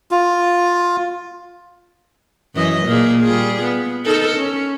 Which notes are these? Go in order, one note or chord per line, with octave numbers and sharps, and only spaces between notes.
F4
F#2 E3 D#5
A#2 A#3 G#4
G3 F4 G#4
B3
D#4 A4 A#4
C#4